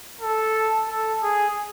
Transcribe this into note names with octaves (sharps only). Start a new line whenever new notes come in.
A4
A4
G#4